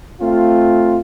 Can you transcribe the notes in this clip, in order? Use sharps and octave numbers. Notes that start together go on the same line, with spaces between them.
A3 C4 F4